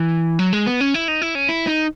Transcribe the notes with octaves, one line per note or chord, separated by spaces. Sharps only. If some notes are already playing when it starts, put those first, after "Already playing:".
Already playing: E3
F#3
G#3
B3
C#4
E4
D#4
E4
C#4
E4
D#4